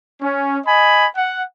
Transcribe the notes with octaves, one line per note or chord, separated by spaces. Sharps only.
C#4
D#5 G#5 B5
F#5